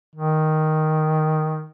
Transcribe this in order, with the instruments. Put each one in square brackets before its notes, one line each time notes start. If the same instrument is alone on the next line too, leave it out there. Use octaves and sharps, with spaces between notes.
[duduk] D#3